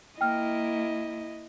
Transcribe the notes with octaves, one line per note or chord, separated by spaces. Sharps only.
A#3 E4 D#5 G5 F6